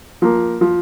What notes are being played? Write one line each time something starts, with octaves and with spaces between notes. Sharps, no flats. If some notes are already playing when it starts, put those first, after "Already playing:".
F3 A#3
F3